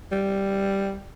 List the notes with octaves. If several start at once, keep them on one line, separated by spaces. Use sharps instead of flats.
G3